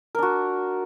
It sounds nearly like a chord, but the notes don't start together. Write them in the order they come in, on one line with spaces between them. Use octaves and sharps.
A#4 D4 F#4